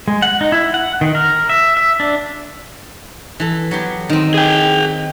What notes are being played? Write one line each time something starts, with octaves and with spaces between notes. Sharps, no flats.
G#3
F#5
D#4
E4
F#5
D#3
A#4
E5
E5
D4
E3 A4
F#3 B3 G4
D#3 C4
G#4 G5